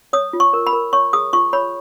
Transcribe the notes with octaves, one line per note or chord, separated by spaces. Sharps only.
C#5 D#6
F4
C#6
A#4
B5
A#4
C#5 C#6
G#4 D#6
F4 C#6
C#5 B5